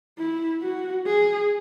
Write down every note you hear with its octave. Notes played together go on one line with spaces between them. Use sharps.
E4
F#4
G#4